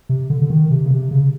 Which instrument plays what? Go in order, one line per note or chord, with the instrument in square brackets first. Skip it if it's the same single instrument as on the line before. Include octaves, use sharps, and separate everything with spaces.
[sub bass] C3
D3
D3
D#3
C3
C#3
C3
C#3